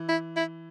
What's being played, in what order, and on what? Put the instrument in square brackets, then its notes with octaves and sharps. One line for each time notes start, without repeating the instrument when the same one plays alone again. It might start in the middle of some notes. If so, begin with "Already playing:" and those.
Already playing: [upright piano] E3
[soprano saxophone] E4
E4